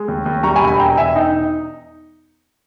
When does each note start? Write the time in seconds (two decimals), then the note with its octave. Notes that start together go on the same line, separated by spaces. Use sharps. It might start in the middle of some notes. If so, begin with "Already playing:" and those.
Already playing: G#3
0.08 D#2
0.26 D#2
0.43 G3 A#5 C#6
0.56 G#5 B5
0.62 E1
0.67 G#5 B5
0.79 E1 G5 A#5
0.97 E1 E5 G#5
1.08 E5
1.15 D#4 D#5 G5